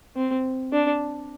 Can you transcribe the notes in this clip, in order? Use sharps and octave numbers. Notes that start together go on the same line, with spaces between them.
C4
D4